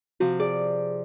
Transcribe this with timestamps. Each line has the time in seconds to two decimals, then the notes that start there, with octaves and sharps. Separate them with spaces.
0.20 C3 F3 F#4
0.40 G#4 D5